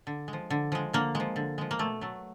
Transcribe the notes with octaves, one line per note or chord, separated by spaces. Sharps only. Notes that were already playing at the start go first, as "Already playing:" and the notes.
D3
G#3
F3
D3
F3 G#3
D3 A#3
G#3
F3
D3
F3 G#3
A#3
B2 A3
F#3 A3